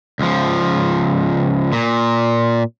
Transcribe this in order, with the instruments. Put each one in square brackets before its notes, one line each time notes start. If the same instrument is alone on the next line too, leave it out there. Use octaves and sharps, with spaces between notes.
[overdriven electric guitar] C#2 F3
A#2